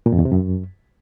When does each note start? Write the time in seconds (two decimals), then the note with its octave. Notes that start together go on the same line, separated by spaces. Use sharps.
0.06 A#2
0.12 F2
0.19 E2
0.25 C3
0.32 F#2